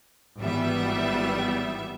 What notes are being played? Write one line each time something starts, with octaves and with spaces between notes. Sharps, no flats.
G#1 E3 G3 B3 E5